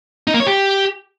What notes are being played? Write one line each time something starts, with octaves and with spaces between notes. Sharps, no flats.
D#4
A#3
C#5
G4